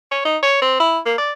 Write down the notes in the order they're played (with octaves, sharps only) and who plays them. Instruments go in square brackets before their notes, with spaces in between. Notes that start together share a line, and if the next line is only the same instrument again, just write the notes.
[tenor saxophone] C#5
D#4
C#5
C4
E4
A#3
D5